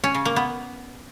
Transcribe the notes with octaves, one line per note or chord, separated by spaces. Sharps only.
C#4
C#3
A#3
B3